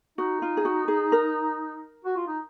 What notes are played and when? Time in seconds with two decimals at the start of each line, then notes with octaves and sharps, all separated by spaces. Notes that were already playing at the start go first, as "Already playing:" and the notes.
0.18 D#4 F#4
0.42 F4
0.57 G#4
0.65 F#4
0.88 G#4
1.12 A#4
2.05 F#4
2.16 F4
2.27 D#4